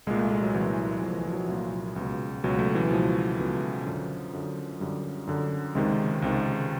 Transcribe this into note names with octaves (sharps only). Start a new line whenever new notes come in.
C2 A#2 G#3
A3
G#3
F#3
C2 A#2 E3
C2 A#2 F3
E3
F3
F#3
F3
C2 A#2
C#2 B2
C#2 B2 F#3
A3
E3
C#2 B2 F3
C#2 B2
F#2 D3
F#2 D3
F#2 D3 G3
F#2 D3
C#2 C3 D#3 G#3
C#2 C3 D#3